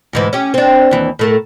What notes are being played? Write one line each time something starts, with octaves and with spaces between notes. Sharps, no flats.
D2 G#2 E3
C#4 G4
C4 D4
D#2 E3
A2 A3 A#4